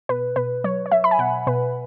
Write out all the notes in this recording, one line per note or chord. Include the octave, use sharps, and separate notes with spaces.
B2 B4
B2 B4
F#3 C#5
C#5
F#3 E5
B5
G#5
B2 F#5
B2 B4